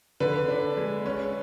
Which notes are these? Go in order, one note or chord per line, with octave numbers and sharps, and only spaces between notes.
D3 B4
D4
G#3
C#4